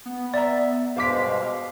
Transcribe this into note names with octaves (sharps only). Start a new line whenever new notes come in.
B3
D5 E5 A#5
G2 B2 G#3 C5 F5 D6 B6